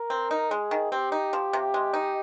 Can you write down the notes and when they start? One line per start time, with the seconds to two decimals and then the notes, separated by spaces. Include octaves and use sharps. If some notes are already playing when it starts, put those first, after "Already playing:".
Already playing: A#4
0.10 C4
0.31 D#4
0.51 G#3 G#4
0.71 D#3
0.91 C4 G4
1.12 D#4
1.33 F3
1.53 C3
1.74 G#3
1.93 D#4